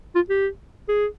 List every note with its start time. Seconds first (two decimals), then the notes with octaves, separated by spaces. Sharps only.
0.15 F4
0.29 G4
0.88 G#4